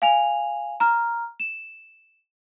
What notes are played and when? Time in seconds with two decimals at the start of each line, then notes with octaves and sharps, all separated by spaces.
0.02 F5 G#5 F7
0.80 A#5 F6
1.40 E7